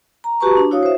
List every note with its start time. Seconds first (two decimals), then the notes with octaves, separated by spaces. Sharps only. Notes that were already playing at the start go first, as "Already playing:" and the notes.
0.24 A#5
0.40 F#4 G4 B4 A5 A#5 C#6
0.57 D4
0.71 E4 F#4 C#5 F5 D#6
0.83 C5 E5